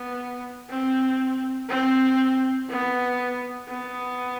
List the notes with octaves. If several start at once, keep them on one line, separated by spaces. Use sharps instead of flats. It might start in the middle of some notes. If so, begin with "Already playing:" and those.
Already playing: B3
C4
C4
B3
B3